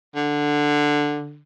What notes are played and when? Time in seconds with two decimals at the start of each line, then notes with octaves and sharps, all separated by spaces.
0.15 D3